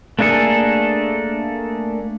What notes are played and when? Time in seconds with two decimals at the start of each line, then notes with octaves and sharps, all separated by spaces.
0.19 A3 A#3 D4 G#4 A4